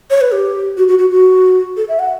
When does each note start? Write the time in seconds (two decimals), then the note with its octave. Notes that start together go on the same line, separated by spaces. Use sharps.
0.10 C#5
0.21 B4
0.32 G4
0.77 F#4
0.88 F#4
0.99 F#4
1.10 F#4
1.77 A4
1.89 E5
1.99 F#5